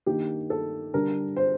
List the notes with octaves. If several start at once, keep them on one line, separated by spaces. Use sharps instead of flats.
D#3 A#3 D4 G4
A4
D3 G3 D4 A#4
C5